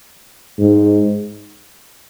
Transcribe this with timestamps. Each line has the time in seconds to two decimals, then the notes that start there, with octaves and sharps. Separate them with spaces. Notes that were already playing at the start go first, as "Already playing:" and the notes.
0.59 G#2